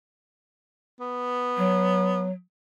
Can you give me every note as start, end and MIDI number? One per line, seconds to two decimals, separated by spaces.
1.01 2.25 59
1.57 2.31 54